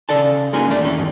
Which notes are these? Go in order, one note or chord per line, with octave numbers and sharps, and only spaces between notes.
C#3 A4 D5 A5
G#3 A#3 C#4 D#4 F#4 G#4
D#2 D3 D#3 A3 D4
D#3 E3 C#4
E2 G#2